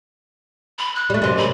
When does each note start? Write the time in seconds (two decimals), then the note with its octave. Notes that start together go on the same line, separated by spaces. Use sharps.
0.79 B5
0.95 F#6
1.10 G3 A3
1.22 F#2 C3 D#5
1.37 B5